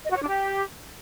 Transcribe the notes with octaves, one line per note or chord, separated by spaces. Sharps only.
D#5
F#4
C#5
D4
G4